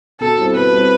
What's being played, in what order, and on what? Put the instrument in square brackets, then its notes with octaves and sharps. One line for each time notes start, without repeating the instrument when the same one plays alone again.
[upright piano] B2 [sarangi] A4
[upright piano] G3 C4 E4
[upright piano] B2 [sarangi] B4
[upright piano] G3 C4 E4